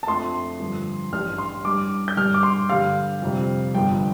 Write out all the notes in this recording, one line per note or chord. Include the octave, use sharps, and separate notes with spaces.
A5
F2 F3 A3 D4 C6
G2 D3 F3
A1 G2 G3 D4 F6
C6
G2 G3 D4 D6
G6
G2 G3 D4 F6
D6
C6
G2 D3 G3 F5
F2 C3 G3 C4
G1 G2 D3 F3 G5